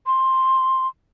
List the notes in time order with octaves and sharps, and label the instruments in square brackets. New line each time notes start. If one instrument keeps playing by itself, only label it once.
[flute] C6